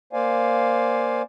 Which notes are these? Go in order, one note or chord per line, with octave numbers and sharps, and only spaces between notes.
A#3 C5 D5 F5 G#5